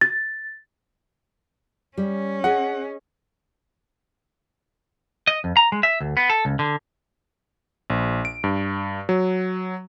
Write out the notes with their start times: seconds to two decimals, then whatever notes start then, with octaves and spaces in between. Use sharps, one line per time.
0.01 A6
1.98 G3 C#4
2.44 G#4 D#5 F#5 G#5
5.27 D#5
5.44 F2
5.57 A#5
5.72 G#3
5.83 E5
6.01 D2
6.17 B3
6.30 A4
6.45 C#2
6.59 D3
7.90 A#1
8.25 D7
8.44 G2
9.09 F#3